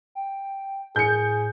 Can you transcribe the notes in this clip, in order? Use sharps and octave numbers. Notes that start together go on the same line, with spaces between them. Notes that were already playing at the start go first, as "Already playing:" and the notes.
G5
A2 G#4 G6 C#7